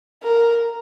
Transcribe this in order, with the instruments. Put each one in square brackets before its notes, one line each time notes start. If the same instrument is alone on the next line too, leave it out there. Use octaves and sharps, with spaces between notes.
[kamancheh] A#4